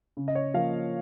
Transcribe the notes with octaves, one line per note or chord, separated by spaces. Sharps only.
C#3
D#5
C#5
F3 A#3 F5